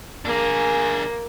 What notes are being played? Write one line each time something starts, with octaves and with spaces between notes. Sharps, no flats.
A#3 D4 G#4